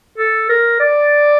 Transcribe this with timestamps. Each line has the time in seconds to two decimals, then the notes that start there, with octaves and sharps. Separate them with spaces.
0.18 A4
0.49 A#4
0.80 D5